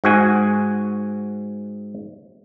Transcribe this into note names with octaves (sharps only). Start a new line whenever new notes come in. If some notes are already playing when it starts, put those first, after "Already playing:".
G#2 F#4 G#5